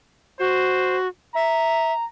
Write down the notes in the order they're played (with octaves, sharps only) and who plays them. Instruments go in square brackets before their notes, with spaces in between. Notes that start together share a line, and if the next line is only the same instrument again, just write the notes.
[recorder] F#4 [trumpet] C5
[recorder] E5 [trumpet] A#5